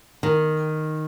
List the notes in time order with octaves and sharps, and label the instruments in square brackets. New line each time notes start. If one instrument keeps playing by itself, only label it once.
[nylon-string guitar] D#3